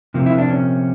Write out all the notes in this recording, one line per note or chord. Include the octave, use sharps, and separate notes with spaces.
C3 F3 A#3
E4
D4
C#4